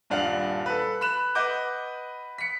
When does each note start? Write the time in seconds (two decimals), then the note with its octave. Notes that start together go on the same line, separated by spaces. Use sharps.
0.10 D#1 G2 D4 F5 F#5 F6
0.66 A4 B4
1.01 B5 F#6 E7
1.35 B4 D#5 F#5 D6 G6
2.38 B6 C#7